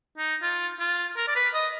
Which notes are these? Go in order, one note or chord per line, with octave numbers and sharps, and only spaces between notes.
D#4
F4
F4
A#4
D5
B4
D#5